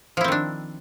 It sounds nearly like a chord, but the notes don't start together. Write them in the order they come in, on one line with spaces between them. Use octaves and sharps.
F3 E4 C4 D#3 D4